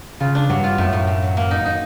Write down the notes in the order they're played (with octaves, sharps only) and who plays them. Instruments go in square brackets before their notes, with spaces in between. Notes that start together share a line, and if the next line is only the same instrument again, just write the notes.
[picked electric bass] C#3 [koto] F4
[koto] D4
[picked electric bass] G2 [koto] F#3
[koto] F4
[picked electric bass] F#2 [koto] A2
[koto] A2
A2
F#3
A#3
D#4
D#4